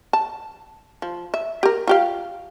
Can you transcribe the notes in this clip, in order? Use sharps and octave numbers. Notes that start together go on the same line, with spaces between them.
A5
F3
E5
G4 A#4
F4 G4 F5